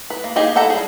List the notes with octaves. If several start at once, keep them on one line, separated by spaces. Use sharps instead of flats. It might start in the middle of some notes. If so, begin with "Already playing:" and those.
B4
A#3
A#3 D#4 G4 G#4 G#5
E4 A4 F#5 G5 A#5
G3 G#4